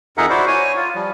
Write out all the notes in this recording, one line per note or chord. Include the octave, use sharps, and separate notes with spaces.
F2 D#4 G#4 A#4 E5 F#5
E4 F#4 C5 D5
C#5 G#5
F4
F3 G3